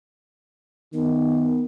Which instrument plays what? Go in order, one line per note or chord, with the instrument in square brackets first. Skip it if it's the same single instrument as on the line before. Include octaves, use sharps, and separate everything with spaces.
[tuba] D#3 [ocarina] B3